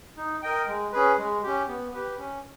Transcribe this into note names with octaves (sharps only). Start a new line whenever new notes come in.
D#4
A#4 D#5 G5
G#3
C#4 G#4 B4
G#3
C#4 G4
B3
G4 B4
C#4